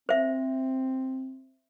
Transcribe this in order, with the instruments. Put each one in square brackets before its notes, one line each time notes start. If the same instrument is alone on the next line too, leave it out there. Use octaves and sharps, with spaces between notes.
[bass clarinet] C4 [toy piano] C5 E5